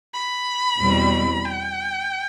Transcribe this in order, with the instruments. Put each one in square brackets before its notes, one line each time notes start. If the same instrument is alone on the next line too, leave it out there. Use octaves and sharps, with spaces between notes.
[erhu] B5
[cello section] E2 B2 G3 C4
[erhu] G5